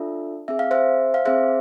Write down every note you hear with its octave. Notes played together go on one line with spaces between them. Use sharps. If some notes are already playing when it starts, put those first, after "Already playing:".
Already playing: D4 F4 A4 E5
C4 G#4 E5
F5
C5 E5
F5
C4 G#4 C5 E5